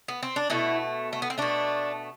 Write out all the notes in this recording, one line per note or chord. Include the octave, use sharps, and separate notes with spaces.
B3
C4
D4
B2 A3 E4
A3
B3
C4
B2 A3 D4